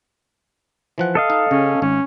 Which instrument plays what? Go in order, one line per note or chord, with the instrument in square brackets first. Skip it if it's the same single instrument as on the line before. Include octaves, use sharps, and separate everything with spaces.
[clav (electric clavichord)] E3 F3 F#5
[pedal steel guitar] A4 D#5 F5
[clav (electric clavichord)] D#4
[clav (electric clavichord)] C#3 [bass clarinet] C#4
[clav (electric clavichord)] G#1 [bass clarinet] C#4